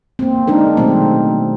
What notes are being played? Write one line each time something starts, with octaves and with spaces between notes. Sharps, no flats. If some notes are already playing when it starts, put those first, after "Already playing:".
A#3 C4
G#3 D4 D#4 A#4
B2 D#3 F#3 G#3 A3 C4